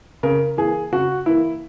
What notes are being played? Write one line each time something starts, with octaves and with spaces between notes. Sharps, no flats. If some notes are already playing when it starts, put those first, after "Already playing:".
C#3 A#4
E3 A#3 G#4
C#3 F#4
E3 A#3 E4